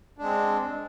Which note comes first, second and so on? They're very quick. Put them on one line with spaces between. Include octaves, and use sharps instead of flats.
D4 G#3 C4